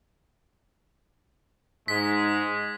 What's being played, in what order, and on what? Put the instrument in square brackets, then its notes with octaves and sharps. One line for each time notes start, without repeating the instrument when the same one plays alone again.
[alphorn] G#2 [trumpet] G#3 [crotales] B6